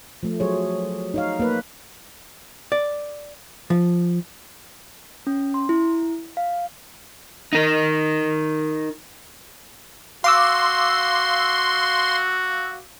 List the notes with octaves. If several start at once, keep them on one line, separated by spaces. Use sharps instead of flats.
F3 A3
F#3 G#4 C5 C#5
D#4 C#5 F5
A#3 B4
D5
F3
C#4
C6
E4
F5
D#4 A#4
F#4 F5 C6 D6 E6